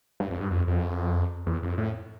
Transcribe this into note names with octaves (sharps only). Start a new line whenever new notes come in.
G2
F2
G2
F2
F2
E2
F2
A2